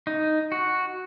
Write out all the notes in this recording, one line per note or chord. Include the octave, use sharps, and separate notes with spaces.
D#4
F#4